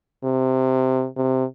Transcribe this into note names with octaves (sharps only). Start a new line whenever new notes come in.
C3
C3